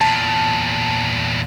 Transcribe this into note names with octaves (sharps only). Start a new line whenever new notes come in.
E2 A#2 A5